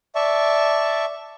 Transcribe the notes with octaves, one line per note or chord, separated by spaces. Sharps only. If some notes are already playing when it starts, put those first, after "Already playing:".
D5 E5 A5 C#6